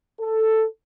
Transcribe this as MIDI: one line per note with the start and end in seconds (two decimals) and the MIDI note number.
0.20 0.63 69